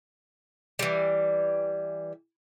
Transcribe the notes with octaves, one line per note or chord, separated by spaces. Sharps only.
E3 G3